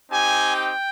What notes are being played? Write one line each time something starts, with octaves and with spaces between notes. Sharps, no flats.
C4 D#4 G4 G#5
G5